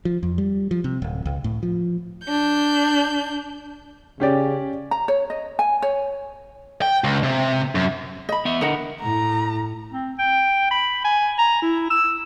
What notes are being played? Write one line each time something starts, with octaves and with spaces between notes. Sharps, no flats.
F3
F2
G3
F3
C3
D1
C#2
A2
F3
D4 G6
C#3 C#4 G4 D5
A#5
C#5
D#5
G#5
C#5
G5
C#2
C3
F#2
D#5 B5
B3 E5
D3 A#4 D#5 F#5
A2 A#5
C4
G5
B5
G#5
A#5
E4
E6